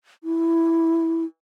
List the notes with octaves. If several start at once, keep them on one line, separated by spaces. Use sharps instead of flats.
E4